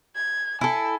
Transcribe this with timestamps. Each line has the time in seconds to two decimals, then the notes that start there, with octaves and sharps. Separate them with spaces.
0.15 G#6
0.61 E4 A4 G#5